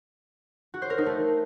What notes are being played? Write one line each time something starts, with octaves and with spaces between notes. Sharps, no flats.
F#4
C5
A#4
D#4
A3